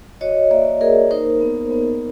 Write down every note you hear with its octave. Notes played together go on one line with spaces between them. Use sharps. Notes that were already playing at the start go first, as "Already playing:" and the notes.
F#4 C#5 D#5
A#3 D5 E5
A#3 G#4 A#4
D#4 A#4 C5
B3
B3